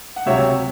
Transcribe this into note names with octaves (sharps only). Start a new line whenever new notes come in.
F#5
C#2 C3 F#3 C#5 E5